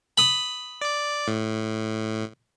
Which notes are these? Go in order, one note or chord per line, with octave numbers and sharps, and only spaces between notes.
B5 D#6
D5 D6
A2